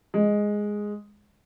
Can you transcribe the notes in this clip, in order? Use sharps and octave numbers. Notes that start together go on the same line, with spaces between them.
G#3